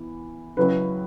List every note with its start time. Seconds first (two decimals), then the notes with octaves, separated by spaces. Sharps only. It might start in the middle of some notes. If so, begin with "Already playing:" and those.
Already playing: E3 B3
0.57 C#2 C#3 F#3 E4 B4